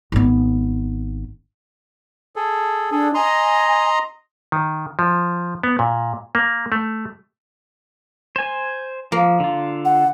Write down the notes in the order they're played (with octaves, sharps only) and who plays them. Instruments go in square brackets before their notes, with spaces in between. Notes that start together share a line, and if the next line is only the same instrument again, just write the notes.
[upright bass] G#1 B3
[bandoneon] G#4 A4
[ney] D4 [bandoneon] G#4 A4
[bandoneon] D#5 A#5 C6 [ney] G#5
[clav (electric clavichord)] D#3
F3
B3
A#2
A#3
A3
[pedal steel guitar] C5 G#5
[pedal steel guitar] F3 [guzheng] A#3
[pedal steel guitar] D3 F4
[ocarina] F#5